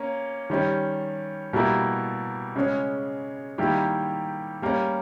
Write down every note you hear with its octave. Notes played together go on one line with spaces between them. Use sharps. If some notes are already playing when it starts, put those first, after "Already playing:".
Already playing: A#3 C#4
D#3 G3 C#4
B2 G3 A#3 E4 A#4
C#3 G#3 C#4
D#3 G3 A#3 E4 G4
G3 A#3 C#4